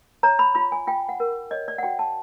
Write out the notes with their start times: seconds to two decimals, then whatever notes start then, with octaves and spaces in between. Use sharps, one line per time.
0.23 C#5 A#5
0.39 B5
0.55 F4 B5
0.72 G#5
0.87 F4 G5
1.09 F#5
1.20 A#4
1.51 C#5 D#5
1.68 D5
1.78 F#5
1.83 F#4 G5
1.99 A5